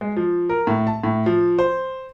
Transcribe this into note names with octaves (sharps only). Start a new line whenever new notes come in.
G#3
F3
A#4
A2
A5
A2
F3
C5